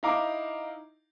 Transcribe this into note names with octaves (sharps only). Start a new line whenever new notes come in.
D#4 E4 F5 A#5 D6